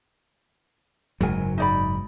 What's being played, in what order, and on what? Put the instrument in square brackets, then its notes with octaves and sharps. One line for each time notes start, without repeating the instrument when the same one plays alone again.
[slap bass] F#1 G#2 F#3 [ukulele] A#4 G#5
[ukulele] D#4 D5 B5